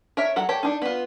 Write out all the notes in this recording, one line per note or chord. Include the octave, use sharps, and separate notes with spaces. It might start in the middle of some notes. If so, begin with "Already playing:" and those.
A#4 C#5 E5
F#3 A4 F#5
G4 A4 C#5
D4 D#4
B3 F4